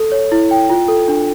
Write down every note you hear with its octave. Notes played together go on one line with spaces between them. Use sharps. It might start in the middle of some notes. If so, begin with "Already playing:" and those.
Already playing: A4
C#5
E4
G5
F4
A4
D4